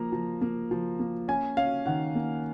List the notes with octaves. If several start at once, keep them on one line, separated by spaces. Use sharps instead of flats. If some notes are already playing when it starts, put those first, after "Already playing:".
Already playing: F3 A#3 A#5
F3
A#3
F3
A#3
C#4 G#5
C#4 F5
D#3 F#5
A#3